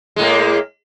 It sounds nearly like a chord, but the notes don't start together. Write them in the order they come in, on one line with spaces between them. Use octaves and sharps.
G#3 A2 A#3